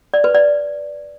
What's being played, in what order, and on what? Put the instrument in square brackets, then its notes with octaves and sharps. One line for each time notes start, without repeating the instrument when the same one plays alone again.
[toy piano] D5
B4
D5